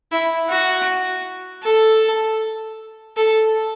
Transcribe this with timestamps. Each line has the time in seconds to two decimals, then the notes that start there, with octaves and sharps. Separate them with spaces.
0.12 E4
0.50 F#4
1.64 A4
3.17 A4